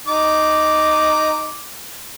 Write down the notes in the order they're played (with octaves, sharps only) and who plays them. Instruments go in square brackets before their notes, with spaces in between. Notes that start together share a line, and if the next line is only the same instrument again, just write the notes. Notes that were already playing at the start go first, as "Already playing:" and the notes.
[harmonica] D#4 [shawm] D6